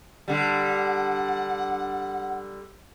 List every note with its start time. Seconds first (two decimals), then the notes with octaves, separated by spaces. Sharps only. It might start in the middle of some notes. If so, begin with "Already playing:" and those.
0.28 D3 G3 F#5